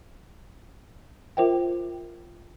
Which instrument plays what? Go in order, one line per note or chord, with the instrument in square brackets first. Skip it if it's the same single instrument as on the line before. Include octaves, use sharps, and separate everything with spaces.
[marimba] F4 A#4 C5 E5 G5